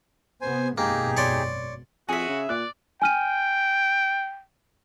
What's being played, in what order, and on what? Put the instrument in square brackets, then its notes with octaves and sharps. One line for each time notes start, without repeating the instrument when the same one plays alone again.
[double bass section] C3 B3 [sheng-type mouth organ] C5 G#5
[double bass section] G#1 F#2 B2 [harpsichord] A#3 [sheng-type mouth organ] D#4 G4 G#4
[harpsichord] C#5 D5 C6
[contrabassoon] F2 [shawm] F#4 [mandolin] G#4 E5 [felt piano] G#5
[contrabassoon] C#3
[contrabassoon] A#2 [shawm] D5 [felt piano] F#6
[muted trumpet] G5 [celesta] G#5 F6 D#7